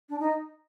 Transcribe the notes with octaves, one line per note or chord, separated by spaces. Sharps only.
D4
D#4